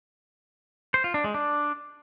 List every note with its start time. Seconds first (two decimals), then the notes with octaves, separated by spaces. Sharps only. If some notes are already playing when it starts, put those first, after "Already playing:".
0.94 C5
1.04 F4
1.14 D4
1.24 G#3
1.34 D4